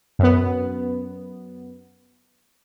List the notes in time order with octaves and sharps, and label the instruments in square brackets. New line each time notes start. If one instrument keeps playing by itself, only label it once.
[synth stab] F#2 B3